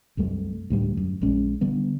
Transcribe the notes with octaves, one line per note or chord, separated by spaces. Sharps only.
C2 F#2 G3 A3
D2 A2 G3
F#2
A#1 G#3 C#4
D3 G3 B3